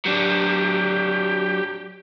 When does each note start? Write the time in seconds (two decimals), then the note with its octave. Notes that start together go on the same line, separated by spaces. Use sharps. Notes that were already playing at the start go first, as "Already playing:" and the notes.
0.06 F#3 D4 G4